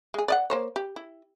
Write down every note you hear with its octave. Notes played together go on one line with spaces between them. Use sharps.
G#3 G#4
D5 D#5 F#5
A#3 C5 C#5
G4
E4